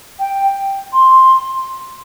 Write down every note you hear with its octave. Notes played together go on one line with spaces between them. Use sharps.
G5
C6